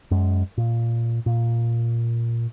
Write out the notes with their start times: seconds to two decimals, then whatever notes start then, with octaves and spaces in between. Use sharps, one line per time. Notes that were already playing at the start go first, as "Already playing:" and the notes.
0.11 F#2 G#3
0.58 A#2
1.26 A#2